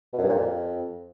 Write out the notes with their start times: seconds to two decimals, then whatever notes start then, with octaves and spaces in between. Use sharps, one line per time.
0.13 B2
0.19 F#2
0.24 G2
0.29 A#2
0.35 F2